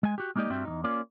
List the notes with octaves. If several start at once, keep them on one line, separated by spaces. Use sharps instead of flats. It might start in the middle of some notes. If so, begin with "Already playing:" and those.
G#3 G#5
F#4 G4
G#3 A#3 D#4 G4 D5 D#5
G2 G3 C4 F#4 E5 G5
E2 G2 D#4
A#3 C#4 F4 D5